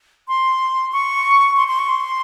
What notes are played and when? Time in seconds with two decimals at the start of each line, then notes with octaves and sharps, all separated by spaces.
0.28 C6
0.93 C#6
1.57 C6
1.68 C6
1.79 C#6
1.89 C6